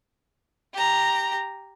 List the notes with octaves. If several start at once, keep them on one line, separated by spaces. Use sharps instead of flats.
G4 A#5